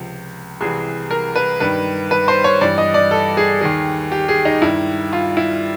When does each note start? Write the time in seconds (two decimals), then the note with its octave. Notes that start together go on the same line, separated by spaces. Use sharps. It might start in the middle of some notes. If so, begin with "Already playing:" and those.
Already playing: C#2 C3 F3
0.61 C2 C3 E3 G#4
1.11 A#4
1.36 B4
1.60 G2 D#3 B4
2.11 B4
2.28 C5
2.44 C#5
2.61 G2 E3 D5
2.78 D#5
2.94 D5
3.11 A4
3.37 G#4
3.61 D#2 D#3 G#4
4.12 G4
4.28 G#4
4.45 D#4
4.62 G2 D#3 E4
5.13 F4
5.37 E4